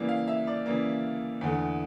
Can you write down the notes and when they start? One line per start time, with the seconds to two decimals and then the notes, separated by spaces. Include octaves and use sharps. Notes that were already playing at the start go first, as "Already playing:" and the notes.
Already playing: C#3 E3 G3 A#3
0.09 F5
0.28 E5
0.47 D5
0.66 C#3 E3 G3 A#3
1.41 E2 D3 A3